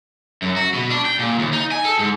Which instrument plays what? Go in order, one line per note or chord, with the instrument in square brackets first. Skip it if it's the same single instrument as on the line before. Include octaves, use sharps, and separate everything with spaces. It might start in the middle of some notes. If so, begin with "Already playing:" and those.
[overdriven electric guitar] F#2
F#4
B2
D4
G5
A#2
D#2
D#4
G#5
A4
G#2